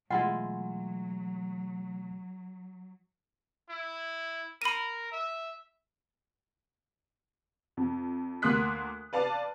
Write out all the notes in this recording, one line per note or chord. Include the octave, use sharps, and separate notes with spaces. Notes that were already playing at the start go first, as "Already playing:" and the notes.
B2 E3 F#3 G#3 A3 E4 F4 F#5
E4
A#4 B5 D#7
E5
F2
D2 A#3 C6 D#6 F#6 B6
B4 D5 F5 A5